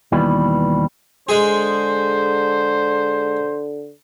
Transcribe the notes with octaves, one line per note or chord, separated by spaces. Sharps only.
D#2 B2 E3 G3
D3 G#3 G#4 C5